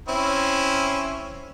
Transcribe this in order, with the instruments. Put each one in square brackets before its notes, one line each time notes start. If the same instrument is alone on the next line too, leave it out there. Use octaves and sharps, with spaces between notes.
[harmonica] C4 C#4 E4